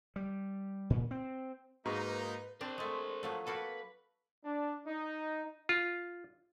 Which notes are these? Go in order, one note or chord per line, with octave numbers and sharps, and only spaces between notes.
G3
A#2
C4
G#2 A#3 D#4 F#4 G#4 B4 A#5
C4 D4 A#4 C5
G#3 A3
F3 F#3 A3
A#3 F#4 A4 B4
D4
D#4
F4